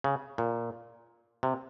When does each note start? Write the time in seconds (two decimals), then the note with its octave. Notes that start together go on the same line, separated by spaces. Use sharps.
0.04 C#3
0.38 A#2
1.43 C3